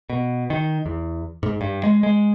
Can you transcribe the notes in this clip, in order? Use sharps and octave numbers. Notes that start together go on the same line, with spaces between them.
B2
D#3
E2
G#2
G2
G#3
G#3